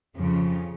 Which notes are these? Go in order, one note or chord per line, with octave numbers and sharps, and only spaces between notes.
F2 C#3 F3